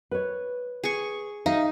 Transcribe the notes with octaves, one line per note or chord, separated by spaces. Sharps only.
B4 C#5
G#4 C#6
D#4 E5 F5